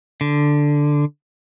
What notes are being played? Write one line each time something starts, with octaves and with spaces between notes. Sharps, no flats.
D3